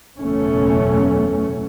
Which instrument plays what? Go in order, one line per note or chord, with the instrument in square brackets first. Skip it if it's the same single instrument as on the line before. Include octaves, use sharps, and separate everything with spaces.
[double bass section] F#1 E2 B2 A3 C#4